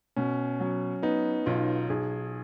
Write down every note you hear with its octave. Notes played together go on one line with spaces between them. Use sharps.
B2 C#4
F#3
B3 D#4
B1 F4
B1 G#4